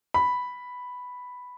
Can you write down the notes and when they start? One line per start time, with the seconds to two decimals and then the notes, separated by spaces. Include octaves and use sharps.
0.14 B5